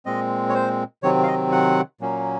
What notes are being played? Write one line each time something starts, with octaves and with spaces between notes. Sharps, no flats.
A#2 G#3 C4 D#5
C#5
C5
C3 D#3 F#3 C4 C#5
F5
D#5
F#5
A#2 F#3 A#3 C#4